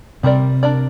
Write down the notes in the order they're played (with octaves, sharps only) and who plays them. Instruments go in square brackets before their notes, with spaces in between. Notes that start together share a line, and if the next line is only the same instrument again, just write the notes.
[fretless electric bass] C3 [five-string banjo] G3 C4 A#4 D5
[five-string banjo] D4 A#4 D5